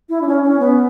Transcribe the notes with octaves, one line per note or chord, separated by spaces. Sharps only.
E4
D4
C#4
C#4
B3